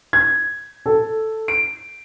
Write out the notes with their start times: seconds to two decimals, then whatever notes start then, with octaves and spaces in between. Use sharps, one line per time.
0.13 G#6
0.86 A4
1.48 D7